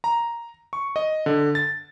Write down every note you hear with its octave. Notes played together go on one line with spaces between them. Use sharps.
A#5
C#6
D#5
D3
A6